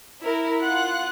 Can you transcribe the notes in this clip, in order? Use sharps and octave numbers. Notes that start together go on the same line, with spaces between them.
E4 A#4
F4 F#5 F#6